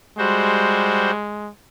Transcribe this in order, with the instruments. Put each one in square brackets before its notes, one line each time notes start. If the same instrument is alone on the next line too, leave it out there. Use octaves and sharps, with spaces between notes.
[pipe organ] G3 F#4 C5 [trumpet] G#3